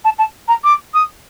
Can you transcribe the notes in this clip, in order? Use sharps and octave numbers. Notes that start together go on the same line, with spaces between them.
A5
A5
A#5
D6
D#6